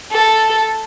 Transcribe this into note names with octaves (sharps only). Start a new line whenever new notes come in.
A4